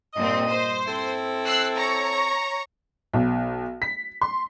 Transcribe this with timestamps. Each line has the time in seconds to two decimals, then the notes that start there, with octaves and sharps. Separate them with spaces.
0.14 G2 A#2 C4 D#5
0.48 C5
0.87 C4 E4 A4
1.43 E6 F#6 C7
1.76 C#5 A#5 C#6
3.13 B1
3.82 B6
4.21 C6